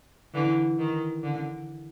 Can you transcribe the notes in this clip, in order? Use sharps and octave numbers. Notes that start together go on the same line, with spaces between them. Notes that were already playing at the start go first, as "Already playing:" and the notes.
D3 E3
D#3
D3